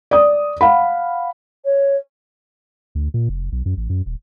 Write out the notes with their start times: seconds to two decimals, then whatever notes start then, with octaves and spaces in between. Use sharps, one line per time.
0.11 D5 D#6
0.61 F5 F#5 B5
1.64 C#5
2.95 D2
3.14 A#2
3.29 F1
3.52 B1
3.66 F#2
3.77 A1
3.90 F#2
4.06 D#1